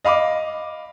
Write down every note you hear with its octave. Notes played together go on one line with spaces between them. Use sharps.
D#5 F5 B5 D6